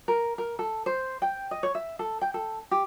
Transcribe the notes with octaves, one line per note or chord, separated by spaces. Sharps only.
A#4
A#4
A4
C5
G5
D#5
C#5
E5
A4
G5
A4
G4